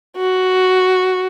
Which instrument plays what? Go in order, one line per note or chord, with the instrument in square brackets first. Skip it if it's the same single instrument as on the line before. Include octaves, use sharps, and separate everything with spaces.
[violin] F#4